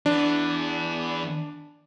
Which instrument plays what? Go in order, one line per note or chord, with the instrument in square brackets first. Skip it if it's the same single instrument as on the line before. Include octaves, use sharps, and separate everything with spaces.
[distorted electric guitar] E3 B3 [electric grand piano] D4